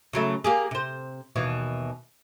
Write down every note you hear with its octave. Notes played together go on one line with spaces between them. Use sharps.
C#3 F#3 A3
A#3 G4 G#4
C3 C5
D#2 B2 E3